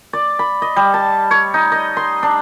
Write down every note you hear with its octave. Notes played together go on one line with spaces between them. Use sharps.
D5
B5
D#5
G3
A5
C#5
D#4
D#5
C6
D4